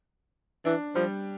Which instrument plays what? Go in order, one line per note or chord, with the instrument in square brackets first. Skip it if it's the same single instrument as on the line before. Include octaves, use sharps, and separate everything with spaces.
[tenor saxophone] E3 [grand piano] D4
[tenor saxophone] F3 [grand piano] G3